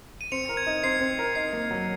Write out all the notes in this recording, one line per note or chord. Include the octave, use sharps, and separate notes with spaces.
D#7
C4 C#7 F7
A#4
G#6
D#4
C4 C7
C4
A#4
D#4 C7
A#3
F#3